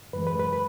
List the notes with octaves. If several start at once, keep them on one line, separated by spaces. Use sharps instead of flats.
F#2 E3 G#3 B4
B4
B4
B4